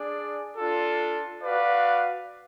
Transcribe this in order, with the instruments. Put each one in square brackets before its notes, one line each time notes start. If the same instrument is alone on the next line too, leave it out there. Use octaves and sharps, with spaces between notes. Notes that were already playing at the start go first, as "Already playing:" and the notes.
Already playing: [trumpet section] D4 G#4 D5
D4 F4 A4
F#4 B4 D5 F5